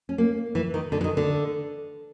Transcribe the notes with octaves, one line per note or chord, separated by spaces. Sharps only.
C#4
A#3
E3
D#3
D3
E3
D#3
D3